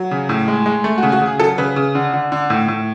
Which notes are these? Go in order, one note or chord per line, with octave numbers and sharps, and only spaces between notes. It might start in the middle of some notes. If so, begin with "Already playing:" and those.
Already playing: F#3
C#3
A2
G#3
G#3
A3
F#4
C#3
F#4
C#3 G#4
F#3 A4
C#3 B4
C#3
D3
D3
D3
A2
A2